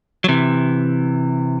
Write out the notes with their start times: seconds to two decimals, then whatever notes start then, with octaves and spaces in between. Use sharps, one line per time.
0.24 F#3
0.29 C3 E3